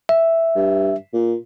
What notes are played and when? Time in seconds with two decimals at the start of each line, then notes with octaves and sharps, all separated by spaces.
0.09 E5
0.56 G2
1.14 A#2